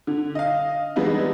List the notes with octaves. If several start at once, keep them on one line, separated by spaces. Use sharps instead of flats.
D3
D#5 F5
E3 G3 G#3 B3 D4 D#4